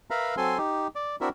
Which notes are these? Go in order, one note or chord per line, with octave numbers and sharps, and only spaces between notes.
A#4 B4 E5 F5 A#5 B5
F#3 C4 A4 G#5 C6
D#4 G4
D5
C4 D4 E4 F#4 A#4 E5